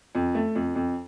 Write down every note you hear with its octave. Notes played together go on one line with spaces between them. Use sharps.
F2
A3
F2
F2